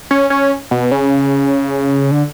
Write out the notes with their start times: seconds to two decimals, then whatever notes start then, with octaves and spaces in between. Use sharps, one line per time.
0.11 C#4
0.30 C#4
0.71 B2
0.91 C#3
2.11 D3